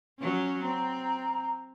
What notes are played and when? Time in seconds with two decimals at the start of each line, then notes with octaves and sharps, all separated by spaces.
0.19 F#3 C#4
0.63 C4 A#5